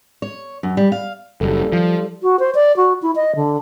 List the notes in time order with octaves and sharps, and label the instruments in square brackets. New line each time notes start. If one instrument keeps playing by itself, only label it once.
[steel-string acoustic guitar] C#5
F#2
G3
F5
[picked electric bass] F#1 [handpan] G3 A4
[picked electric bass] F3
[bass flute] F#4
C5
D5
F#4
E4
D#5
D3